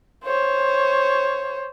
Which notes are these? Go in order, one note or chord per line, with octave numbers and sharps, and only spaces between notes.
C5 C#5